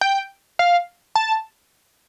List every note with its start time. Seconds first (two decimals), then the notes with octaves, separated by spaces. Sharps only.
0.01 G5
0.59 F5
1.15 A5